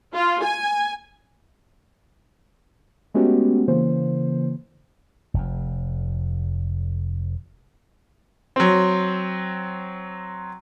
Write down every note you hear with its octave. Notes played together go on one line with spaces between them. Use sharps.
F4
G#5
G#3 A3 B3 C#4 F#4 G4
C#3 E3 A#3 C5
F1 F2
F#3 C4